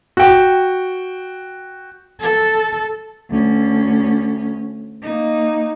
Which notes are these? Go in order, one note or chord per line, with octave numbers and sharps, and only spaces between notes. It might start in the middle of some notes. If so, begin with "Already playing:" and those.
F#4 G5
A4
D2 C#4
A#3 D#4